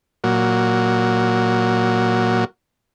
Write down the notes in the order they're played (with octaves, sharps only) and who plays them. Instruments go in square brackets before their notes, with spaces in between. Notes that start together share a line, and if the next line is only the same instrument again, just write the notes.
[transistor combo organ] A#2 F#3